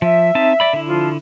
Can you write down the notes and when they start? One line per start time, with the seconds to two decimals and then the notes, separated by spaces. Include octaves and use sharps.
0.02 F3 E5
0.35 C4 D#4 A5
0.60 D5 B5
0.73 D3 E4
0.87 F3 F4